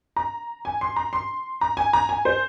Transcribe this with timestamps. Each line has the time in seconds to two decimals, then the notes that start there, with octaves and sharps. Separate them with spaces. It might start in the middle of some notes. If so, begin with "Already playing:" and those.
0.16 A#5
0.65 G#5
0.81 C6
0.96 A#5
1.13 C6
1.61 A#5
1.77 G#5
1.93 A#5
2.09 G#5
2.25 C5